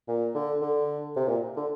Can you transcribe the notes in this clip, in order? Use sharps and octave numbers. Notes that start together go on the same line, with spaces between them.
A#2
D3
D3
C3
A#2
D3